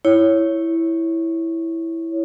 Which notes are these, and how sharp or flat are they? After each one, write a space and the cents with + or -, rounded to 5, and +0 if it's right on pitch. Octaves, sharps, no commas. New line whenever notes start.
E4 +0 C#5 +0